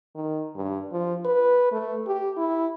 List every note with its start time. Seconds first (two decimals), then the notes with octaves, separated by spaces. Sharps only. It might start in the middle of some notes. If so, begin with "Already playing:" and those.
0.15 D#3
0.56 G2
0.92 F3
1.25 B4
1.72 A3
2.07 G4
2.37 E4